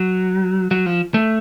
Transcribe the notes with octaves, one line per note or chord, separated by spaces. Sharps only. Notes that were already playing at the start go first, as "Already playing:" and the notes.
Already playing: F#3
F#3
F3
A3